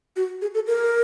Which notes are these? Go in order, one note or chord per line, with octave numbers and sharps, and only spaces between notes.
F#4
G#4
A4
A#4